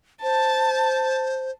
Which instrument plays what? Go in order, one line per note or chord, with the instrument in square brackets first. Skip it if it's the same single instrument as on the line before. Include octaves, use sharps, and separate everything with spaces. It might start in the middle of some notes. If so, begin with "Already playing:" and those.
[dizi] C5 [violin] A5